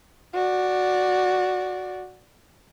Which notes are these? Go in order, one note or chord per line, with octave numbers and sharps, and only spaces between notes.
F#4 D5